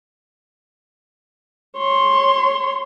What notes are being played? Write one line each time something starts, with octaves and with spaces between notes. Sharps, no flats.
C#5 C6